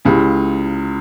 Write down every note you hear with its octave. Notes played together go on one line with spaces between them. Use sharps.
C#2 C#3 G#3 E4 G4